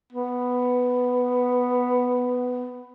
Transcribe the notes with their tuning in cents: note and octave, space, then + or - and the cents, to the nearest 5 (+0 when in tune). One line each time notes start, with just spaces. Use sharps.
B3 +5